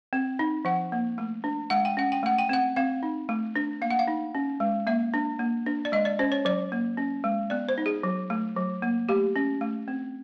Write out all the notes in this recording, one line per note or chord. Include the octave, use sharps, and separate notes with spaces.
C4
D#4
F3 F#5
A#3
A3
D4
G#3 F#5
G5
C#4 F#5
G5
A3 F#5
G5
C4 F#5
C4 F5
D#4
A3
D4
A#3 F5
F#5
F5
D#4
C#4
G#3
A#3 E5
D4
A#3
D4
D5
G#3 D#5
D5
C#4 C5
C#5
F#3 D5
A#3
C#4
G#3
B3 D5
C5
D#4
G#4
F#3
A3
F#3
A#3
A3 G4
C#4
A3
C4